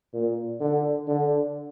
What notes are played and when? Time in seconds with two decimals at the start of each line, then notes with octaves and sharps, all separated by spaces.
0.14 A#2
0.61 D3
1.08 D3